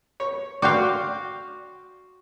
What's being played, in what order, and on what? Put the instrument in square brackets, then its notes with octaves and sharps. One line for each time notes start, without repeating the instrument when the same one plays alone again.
[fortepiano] C#5
[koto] F#4 F5 [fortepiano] D5 G5 C6